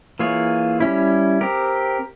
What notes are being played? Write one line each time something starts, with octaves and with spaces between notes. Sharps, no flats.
E3 A#3 F4 G#4 C#5
G3 C#4 E4
C4 G4 A#4